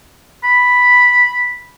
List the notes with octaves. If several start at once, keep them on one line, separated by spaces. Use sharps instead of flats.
B5